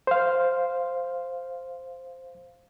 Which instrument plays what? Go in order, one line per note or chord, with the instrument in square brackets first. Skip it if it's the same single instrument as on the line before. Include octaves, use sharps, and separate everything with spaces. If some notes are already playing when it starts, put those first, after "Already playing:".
[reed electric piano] C5 F5